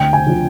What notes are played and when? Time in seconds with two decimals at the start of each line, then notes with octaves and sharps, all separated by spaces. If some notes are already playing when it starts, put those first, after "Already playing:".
Already playing: D2 G5
0.13 G#5
0.27 D3 F3